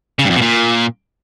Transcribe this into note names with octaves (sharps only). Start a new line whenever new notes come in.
C#3
G2
F2
B2
A#2